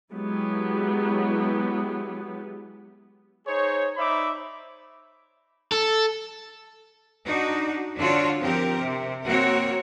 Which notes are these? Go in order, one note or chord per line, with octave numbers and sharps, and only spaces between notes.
F#3 G#3 B3 E4 G4
D#4 G#4 C5 C#5
D#4 C5 D5 E5 B5 D6
A4
D4 D#4 F#4
D3 D4 F4 F#4 C5 C#5
F3 C4 G4 A#4
C3
A#3 C4 F#4 A#4 C#5